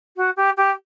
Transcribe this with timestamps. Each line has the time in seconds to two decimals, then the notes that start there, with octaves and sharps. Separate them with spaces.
0.16 F#4
0.36 G4
0.57 G4